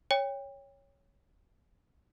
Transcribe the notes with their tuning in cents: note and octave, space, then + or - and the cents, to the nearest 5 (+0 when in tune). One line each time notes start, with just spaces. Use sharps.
C#5 +0 G5 +30